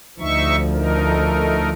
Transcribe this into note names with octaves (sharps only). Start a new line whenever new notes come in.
D2 F3 D#4 E5 C#6
A3 D#4 A#4